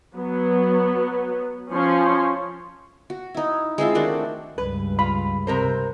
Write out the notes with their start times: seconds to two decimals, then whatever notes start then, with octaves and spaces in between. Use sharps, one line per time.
0.15 F#3 B3
1.71 F3 C#4 C#5 C6
3.10 F#4
3.34 D#4 E4
3.78 G#3 C4 E4 F4
3.95 D#3 A3 D4 F#4
4.58 C#2 G2 B4
4.99 F4 B5
5.47 C3 A#4 C5